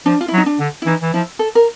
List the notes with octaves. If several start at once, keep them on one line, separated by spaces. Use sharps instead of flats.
F3 D4
F4
E4
F#3
D#4
D4
D3
E4
E3 D#4
E3
F3 E4
A4
A#4